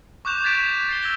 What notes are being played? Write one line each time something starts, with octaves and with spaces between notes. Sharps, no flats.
C#6 D6 F#6 G6 E7 F7
C#6 F#6 G#6 A6 B6 D7
A6 C7 G7
E6 G#6 A#6 G7